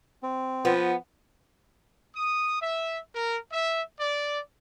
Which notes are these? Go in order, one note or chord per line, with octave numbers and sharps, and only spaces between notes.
C4
F3 B3
D#6
E5
A#4
E5
D5